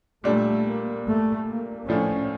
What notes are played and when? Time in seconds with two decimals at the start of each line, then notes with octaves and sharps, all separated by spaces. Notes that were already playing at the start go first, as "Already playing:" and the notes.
0.23 A#2 G3 A3 D4
0.65 A#3
1.06 A3
1.47 A#3
1.89 A2 F3 A3 C#4 D4